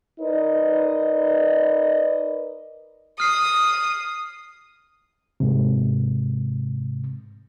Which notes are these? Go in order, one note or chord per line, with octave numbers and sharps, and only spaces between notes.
D#4 A#4 B4 D5 D#5
D#6 F6 C7
G#2 C3